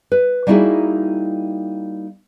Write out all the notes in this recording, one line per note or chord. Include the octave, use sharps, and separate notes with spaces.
B4
G3 A#3 D#4 E4 F#4 G#4